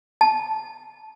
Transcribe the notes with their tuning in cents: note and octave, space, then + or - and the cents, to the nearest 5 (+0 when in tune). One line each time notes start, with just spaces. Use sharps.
A5 -15